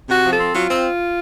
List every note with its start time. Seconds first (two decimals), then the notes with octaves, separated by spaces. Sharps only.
0.09 C3 F#4
0.24 F3
0.31 A4
0.39 C4
0.54 F#3 F4
0.69 C4